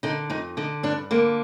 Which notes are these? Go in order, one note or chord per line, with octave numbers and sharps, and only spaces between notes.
D3 D#4
F2 D#4
D3 D#4
G2 D4
D3 A#3